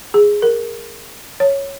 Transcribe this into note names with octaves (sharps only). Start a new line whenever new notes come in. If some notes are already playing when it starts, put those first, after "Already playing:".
G#4
A#4
C#5